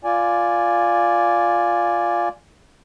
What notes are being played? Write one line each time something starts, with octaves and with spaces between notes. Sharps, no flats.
F4 D5 G#5